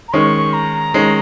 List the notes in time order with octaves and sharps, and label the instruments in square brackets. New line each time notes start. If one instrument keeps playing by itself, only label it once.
[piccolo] A#5
[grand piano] D#3 G#3 C#4 [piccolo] C#6
[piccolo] A#5
[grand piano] D#3 G#3 C#4